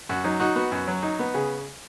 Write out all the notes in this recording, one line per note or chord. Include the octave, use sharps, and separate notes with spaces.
F#2 F#4
F#3 D#4
D#4 F#4
B3 F#4
F#2
F#3
D#4
B3
C#3 G#4